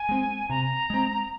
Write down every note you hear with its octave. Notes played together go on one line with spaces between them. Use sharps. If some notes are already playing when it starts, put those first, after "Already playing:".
Already playing: G#5
G#3 C4
C3 A#5
G#3 C4